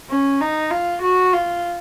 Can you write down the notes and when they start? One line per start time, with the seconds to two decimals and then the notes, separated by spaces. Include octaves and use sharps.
0.10 C#4
0.41 D#4
0.71 F4
1.03 F#4
1.33 F4